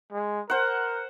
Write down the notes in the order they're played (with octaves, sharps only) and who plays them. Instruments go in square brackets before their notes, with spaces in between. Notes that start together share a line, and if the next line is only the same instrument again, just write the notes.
[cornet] G#3
[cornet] A#4 [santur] C5 F#5